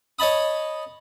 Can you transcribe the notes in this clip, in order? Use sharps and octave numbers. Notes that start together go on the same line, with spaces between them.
C#5 D#5 A5 B5 D#6